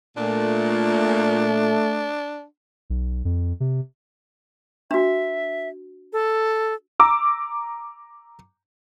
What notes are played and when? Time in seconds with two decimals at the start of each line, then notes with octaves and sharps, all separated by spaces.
0.17 A#2 A3 D4
2.90 B1
3.25 F2
3.60 C3
4.91 D4 F#4 E5
6.13 A4
7.00 A#5 D6 E6